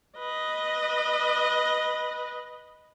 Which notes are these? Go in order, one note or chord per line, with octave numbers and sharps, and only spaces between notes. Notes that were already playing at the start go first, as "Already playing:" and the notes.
B4 D#5